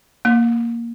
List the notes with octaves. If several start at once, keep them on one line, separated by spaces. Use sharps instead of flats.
A#3